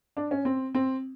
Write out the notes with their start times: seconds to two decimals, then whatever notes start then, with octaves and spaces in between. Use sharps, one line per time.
0.17 D4
0.31 C#4
0.45 C4
0.75 C4